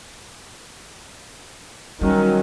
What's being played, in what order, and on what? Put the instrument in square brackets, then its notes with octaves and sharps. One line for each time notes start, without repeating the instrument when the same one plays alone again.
[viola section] D#3 F#3 C#4 [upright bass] G3